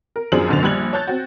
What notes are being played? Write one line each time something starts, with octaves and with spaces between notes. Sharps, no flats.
A#4
B1 F#2 F3 D4 G#4 F#7
F#2 B2 D3 C5 A6 F7
A#1 G3 F#6 G#6 F#7
C#5 A5 F#6 G6 A6
C4 F#4